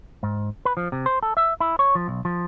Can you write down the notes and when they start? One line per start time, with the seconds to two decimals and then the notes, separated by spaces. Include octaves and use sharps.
0.23 G#2
0.65 B4
0.77 F3
0.92 C3
1.06 C5
1.23 A4
1.37 E5
1.60 E4
1.79 C#5
1.95 F3
2.08 B1
2.25 F3